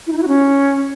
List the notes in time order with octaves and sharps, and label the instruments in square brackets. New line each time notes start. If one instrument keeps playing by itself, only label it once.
[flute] E4
D#4
E4
F#4
C#4